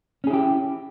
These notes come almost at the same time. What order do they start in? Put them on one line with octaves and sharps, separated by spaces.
C#4 G#4 E4 G4